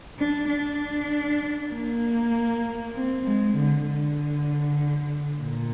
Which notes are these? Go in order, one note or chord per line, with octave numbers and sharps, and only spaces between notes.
D4
D4
A#3
C4
G#3
D3
D3
A#2